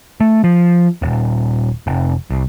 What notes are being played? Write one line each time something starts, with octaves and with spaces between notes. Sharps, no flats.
A3
F3
D#1
F1
C2